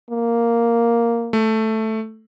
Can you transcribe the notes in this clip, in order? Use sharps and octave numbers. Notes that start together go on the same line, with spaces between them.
A#3
A3